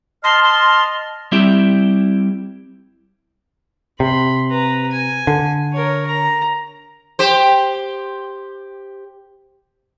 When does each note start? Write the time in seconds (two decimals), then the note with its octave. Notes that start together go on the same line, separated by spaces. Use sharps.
0.24 D#5 A5 C6 F6
0.44 C6
1.32 G3 C4 E4 G4 E5
4.00 C3 B5 C6
4.50 B4 A#5
4.92 G#5
5.27 D3
5.73 A#4 C#5
6.07 A#5
7.19 G4 C5